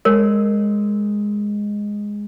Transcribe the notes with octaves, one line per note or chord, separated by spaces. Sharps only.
G#3 A#4 C#5